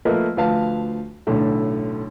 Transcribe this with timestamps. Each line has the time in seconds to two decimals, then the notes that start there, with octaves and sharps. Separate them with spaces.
0.05 F3 A3 A#3 A#4 B4 D#5
0.37 D2 F3 B4 F5 A5
1.27 B1 A2 D3 A3